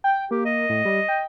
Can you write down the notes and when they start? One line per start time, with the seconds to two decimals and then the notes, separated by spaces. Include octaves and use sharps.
0.04 G5
0.31 A#3 G4
0.45 D#5
0.69 A2
0.85 G3
1.08 G5